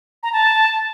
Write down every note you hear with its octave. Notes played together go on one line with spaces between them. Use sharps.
A#5
A5